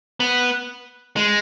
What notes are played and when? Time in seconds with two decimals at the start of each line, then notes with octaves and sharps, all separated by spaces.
0.20 B3
1.16 G#3